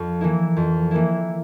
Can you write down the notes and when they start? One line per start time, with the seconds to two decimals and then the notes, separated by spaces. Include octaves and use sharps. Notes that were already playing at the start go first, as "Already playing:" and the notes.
Already playing: F2
0.21 E3 A#3 E4
0.56 F2
0.91 E3 A#3 E4